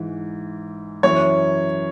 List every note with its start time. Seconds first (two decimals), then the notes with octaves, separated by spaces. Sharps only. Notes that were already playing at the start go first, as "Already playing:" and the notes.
Already playing: G#2 E3
1.03 F#2 E3 C#5